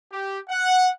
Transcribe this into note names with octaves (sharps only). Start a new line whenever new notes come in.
G4
F#5